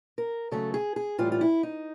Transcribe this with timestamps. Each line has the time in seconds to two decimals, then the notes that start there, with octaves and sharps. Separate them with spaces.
0.18 A#4
0.51 C#3 F#3 A3 A4
0.74 G#4
0.96 G#4
1.18 A2 E3 G3 F4
1.32 F4
1.41 E4
1.63 D#4